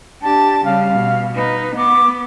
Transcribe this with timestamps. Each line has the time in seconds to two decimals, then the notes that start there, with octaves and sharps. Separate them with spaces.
0.22 D4 G4 A5
0.65 C#3 G3 F5
0.94 B2
1.35 D#4 B4
1.76 B3 D6